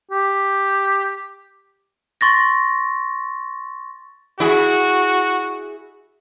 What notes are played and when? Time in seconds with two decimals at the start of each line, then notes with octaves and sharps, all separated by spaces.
0.11 G4
2.21 C6 C#6 A6 A#6
4.40 E4 F#4 G#4